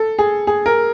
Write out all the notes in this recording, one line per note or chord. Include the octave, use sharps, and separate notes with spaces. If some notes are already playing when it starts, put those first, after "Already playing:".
Already playing: A4
G#4
G#4
A#4